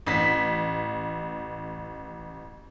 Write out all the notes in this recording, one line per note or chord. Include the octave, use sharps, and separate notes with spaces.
A1 B6